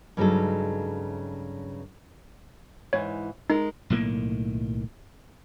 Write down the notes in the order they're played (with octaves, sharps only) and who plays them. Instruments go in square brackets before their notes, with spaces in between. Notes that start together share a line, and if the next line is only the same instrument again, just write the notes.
[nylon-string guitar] G2 C#3 F#3 G#3 D#4 A4
[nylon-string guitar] G#2 E3 [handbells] C#5
[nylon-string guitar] G#3 A#4 [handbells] D#4
[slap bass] B1 A2 D#3 A#3